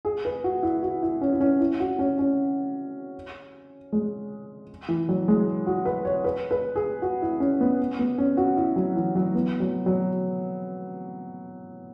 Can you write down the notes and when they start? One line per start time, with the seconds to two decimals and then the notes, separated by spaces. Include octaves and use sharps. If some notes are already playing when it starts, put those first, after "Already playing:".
0.05 G#4
0.25 B4
0.44 F#4
0.63 E4
0.83 F#4
1.03 E4
1.21 C#4
1.33 E4
1.41 C#4
1.60 E4
1.80 F#4
1.99 C#4
2.19 C#4
3.92 G#3
4.89 E3
5.09 F#3
5.28 G#3
5.67 F#4
5.85 B4
6.05 C#5
6.24 B4
6.51 B4
6.76 G#4
7.02 F#4
7.22 E4
7.40 C#4
7.61 B3
7.99 B3
8.18 C#4
8.37 F#4
8.57 E4
8.76 F#3
8.96 E3
9.16 F#3
9.35 B3
9.60 F#3
9.86 F#3